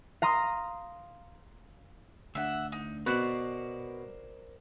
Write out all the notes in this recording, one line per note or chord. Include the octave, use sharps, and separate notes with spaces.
F5 A#5 C6 D#6
D2 D4 E5 F#5
D#4
B2 A#4 C5 D5 F#6